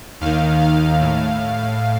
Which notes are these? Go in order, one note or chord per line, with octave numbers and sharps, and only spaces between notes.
D#2 D#3 F5
F5
A2